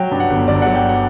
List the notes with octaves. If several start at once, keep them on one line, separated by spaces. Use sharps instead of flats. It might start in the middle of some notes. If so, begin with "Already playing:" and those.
Already playing: F#3 G5
G2
F#5
G1
G1 D5
F#3 F#5
G5
F#5